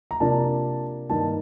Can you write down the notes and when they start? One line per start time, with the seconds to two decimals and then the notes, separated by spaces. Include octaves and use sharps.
0.11 A#5
0.20 C3 F3 A#3 D4 A5
1.09 G2 D#3 A#3 D#4 A5